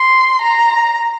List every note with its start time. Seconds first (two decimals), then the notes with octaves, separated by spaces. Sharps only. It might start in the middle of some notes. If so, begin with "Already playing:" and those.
Already playing: C6
0.41 A#5